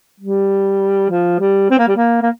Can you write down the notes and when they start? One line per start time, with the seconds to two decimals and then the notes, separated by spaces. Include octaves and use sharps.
0.20 G3
1.10 F3
1.40 G3
1.70 C4
1.79 A#3
1.88 G3
1.96 A#3
2.22 A#3